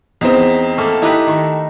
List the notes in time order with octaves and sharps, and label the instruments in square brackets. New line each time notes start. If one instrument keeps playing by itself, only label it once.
[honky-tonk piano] E2 C4 [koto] D#4
[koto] A3 A#3 A4
[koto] D#4 G4 B4 [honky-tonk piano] E4
[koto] D#3 A3